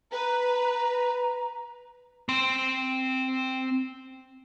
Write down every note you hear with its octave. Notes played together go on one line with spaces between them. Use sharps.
B4 A#5
C4 C6